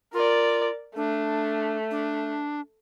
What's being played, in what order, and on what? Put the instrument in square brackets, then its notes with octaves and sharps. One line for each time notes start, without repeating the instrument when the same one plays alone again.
[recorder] F4 [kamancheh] A#4 D5
[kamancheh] A3 [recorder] D4
[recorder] D4